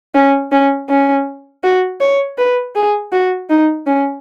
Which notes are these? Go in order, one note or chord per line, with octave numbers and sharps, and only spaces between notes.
C#4
C#4
C#4
F#4
C#5
B4
G#4
F#4
D#4
C#4